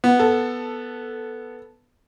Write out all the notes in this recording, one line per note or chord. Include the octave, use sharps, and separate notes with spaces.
B3
A4